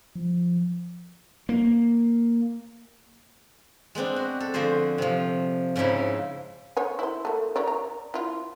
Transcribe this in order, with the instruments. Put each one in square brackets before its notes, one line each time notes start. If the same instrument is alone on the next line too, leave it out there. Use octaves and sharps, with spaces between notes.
[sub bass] F3
[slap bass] A#3
[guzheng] G#3 B3 C4 D4
F#4
A4
D3 F3 F#4 G#4 C5
C3 F3
G#2 C#3 F3 D#4 E4
[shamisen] C5 C#5 G#5
E4 C5
A3 A#3
A#4 C#5 D5
A#5
E4 F4